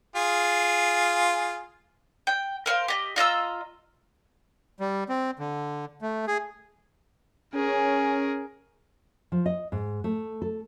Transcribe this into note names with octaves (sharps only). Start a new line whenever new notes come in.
F4 G#4
G5
A#4 C5 F5
G4 D#5
F4 D#5 A#5 E6
G3
C4
D3
A3
G#4
C#4 G#4 A#4
F3
D#5
G#2
A3
A4